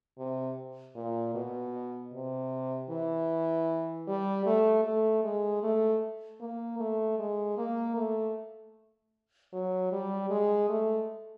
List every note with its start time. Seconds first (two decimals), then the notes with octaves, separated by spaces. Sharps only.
0.18 C3
0.95 A#2
1.35 B2
2.13 C3
2.90 E3
4.08 G3
4.46 A3
4.85 A3
5.24 G#3
5.63 A3
6.41 A#3
6.80 A3
7.19 G#3
7.58 A#3
7.97 A3
9.53 F#3
9.92 G3
10.30 G#3
10.69 A3